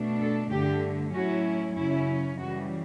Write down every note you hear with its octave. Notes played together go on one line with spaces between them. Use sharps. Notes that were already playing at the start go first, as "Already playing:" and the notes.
Already playing: B2 A3 D4
A4
G2 D3 A3 G4
A2 F#3 C#4 E4 F#4
F#2 C#3 F#3 C#4 E4
C#3 E3 G3 F#4